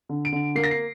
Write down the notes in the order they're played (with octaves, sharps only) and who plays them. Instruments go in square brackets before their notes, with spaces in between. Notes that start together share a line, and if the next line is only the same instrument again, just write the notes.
[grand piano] D3
D7
D3
A#3 C7
A#6
C7